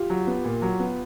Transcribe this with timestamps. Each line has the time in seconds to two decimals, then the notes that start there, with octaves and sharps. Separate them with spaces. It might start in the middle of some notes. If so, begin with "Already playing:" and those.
Already playing: F4 G4
0.10 F#3
0.27 B3
0.45 A#2
0.62 F#3
0.80 B3